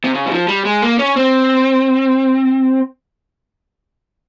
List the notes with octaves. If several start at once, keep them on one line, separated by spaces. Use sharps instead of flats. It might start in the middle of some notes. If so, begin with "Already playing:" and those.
C3
C#3
G3
F3
G3
G#3
A#3
C#4
C4